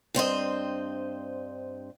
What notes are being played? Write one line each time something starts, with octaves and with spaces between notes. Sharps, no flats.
G2 C4 C5 D#5